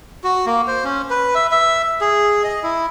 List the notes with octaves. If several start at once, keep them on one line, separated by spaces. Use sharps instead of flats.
F#4
A#3
C5
C#4
B4
E5
E5
G#4
D#5
E4